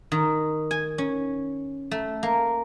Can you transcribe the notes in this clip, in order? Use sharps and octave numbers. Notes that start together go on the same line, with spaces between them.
D#3
G#5
C#4
A3
A#3